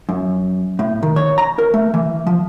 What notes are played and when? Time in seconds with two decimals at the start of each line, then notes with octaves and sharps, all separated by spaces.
0.09 F#2
0.79 A2
1.03 D#3
1.16 C#5
1.38 A#5
1.58 A#4
1.74 A3
1.94 E3
2.27 F3